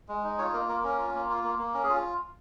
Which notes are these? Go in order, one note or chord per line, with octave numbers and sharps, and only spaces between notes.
G#3
D#4
F4 C#5
A#3 A#4
A#3 A#4
C#4 A#4
F4
A#3
F4
A#3
A#3
C#4 A#4
G#4
F4